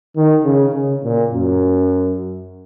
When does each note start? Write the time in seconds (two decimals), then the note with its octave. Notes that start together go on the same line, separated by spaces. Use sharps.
0.16 D#3
0.44 C#3
0.74 C#3
1.03 A#2
1.33 F#2